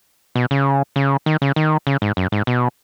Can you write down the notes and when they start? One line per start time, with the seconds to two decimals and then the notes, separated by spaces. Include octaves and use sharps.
0.35 B2
0.51 C#3
0.96 C#3
1.26 D#3
1.42 C#3
1.56 D#3
1.87 C#3
2.02 G#2
2.17 F#2
2.32 G#2
2.47 B2